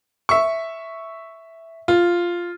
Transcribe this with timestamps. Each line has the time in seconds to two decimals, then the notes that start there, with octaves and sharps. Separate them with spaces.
0.29 E5 C#6
1.88 F4